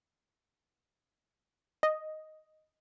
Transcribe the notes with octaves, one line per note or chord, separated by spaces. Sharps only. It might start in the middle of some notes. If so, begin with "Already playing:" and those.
D#5